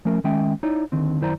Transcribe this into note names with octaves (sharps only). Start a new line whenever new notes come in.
F3 A3 C#4 A#4
D#3 G#3 C#4 E5 G5
D#4 E4 C#5 D5
D#2 D3 D#3 C4
F#2 D#3 E4 C5 D5 A#5